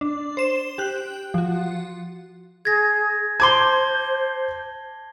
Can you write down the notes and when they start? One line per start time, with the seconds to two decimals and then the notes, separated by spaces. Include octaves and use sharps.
0.01 D4
0.37 C5 E7
0.78 G4 F#6
1.34 F3 F#4
2.65 G#4 G#6 A#6
3.40 C5 A5 C6 D6 G#6 G7